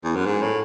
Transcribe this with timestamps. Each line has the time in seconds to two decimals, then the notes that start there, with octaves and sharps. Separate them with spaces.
0.04 E2
0.16 F#2
0.26 G#2
0.42 A2